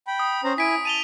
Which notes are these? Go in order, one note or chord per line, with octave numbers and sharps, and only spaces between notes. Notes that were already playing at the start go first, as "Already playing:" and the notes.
G5 B5
D#6
C#4 C5 A#5
E4 G#5 B6 D7
A5 D#7 F7 G7